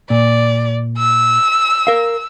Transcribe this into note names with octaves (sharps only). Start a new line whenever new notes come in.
A#2 D5
E6
A#4 F5